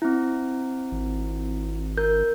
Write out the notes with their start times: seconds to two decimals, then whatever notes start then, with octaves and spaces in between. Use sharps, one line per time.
0.02 C4 E4
0.92 G#1
1.97 A#4 G6